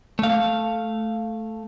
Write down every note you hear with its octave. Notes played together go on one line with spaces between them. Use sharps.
A3 F5